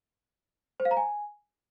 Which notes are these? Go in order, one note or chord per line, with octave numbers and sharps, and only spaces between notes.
C5
F5
A#5
G#5